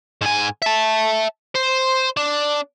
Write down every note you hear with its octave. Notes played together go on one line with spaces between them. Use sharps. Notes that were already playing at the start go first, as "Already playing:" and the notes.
G#2 G#5
E5 A5
C5
D4